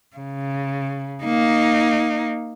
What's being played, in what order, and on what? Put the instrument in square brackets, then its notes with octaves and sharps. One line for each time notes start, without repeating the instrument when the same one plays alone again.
[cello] C#3
A#3 D#4